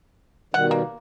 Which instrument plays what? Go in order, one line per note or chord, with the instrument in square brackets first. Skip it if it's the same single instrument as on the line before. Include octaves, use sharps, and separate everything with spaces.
[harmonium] B2 D#3 G3 [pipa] F#5
[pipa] A#3